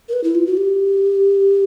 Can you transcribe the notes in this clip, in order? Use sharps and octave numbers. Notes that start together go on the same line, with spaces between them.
A#4
B4
E4
F4
F#4
G4